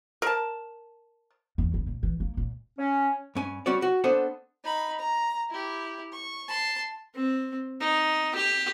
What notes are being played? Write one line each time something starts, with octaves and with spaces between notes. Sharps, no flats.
A#4 A5
E2
C#3
A#2
E3
A#3
A#2
C#4
G2 C#4 G#5
G3 C#4 F#4 C#5 D5
F#4
B3 D4 A4 C5 F#5
D#4 B5
A#5
E4 G4
C#6
A5 C6
C4
D#4
G4